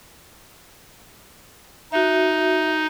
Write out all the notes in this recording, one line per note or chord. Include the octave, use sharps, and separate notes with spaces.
D#4 F#4 E5